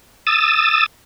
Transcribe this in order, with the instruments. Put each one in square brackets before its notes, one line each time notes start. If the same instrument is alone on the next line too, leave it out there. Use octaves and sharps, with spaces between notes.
[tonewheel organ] D#6 E6 A6